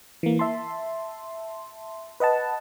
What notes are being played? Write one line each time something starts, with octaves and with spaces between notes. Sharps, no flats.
E3 A#3
E5 A5 C6
B4 D#5 F#5 A5